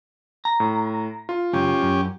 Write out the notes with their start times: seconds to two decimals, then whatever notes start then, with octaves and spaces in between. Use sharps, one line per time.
0.45 A#5
0.60 A2
1.29 F4
1.53 C#2 F#2 C#4 G4
1.82 F#2